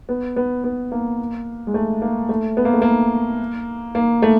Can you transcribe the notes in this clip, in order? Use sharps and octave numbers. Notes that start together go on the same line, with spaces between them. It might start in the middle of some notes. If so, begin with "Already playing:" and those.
B3
B3
B3
A#3
G#3
A3
A#3
A3
B3
A#3
A3
A#3
A#3
A3